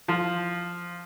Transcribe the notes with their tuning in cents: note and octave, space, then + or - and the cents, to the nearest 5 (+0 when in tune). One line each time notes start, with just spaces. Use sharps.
F3 +0 C6 +0